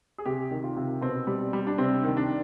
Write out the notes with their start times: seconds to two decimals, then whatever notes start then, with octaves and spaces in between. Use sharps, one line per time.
0.18 G#4
0.26 C3 G4
0.51 D#3
0.64 F4
0.76 C3
1.01 B2 C4
1.27 G3
1.53 G3
1.67 D4
1.78 C3 C4
2.04 D#3
2.17 D4